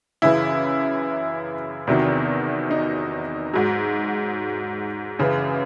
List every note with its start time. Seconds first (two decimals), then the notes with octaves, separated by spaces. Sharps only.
0.22 F#2 C#3 E3 E4
1.87 E2 C3 D#3 F#3
2.71 D#4
3.53 G#2 F#3
5.19 F#2 C#3 E3